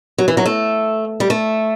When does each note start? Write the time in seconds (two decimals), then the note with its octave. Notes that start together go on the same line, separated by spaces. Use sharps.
0.18 F#3
0.28 E3
0.37 F#3
0.46 A3
1.20 G3
1.30 A3